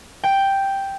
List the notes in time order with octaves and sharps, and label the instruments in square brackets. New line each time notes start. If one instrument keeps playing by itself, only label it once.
[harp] G5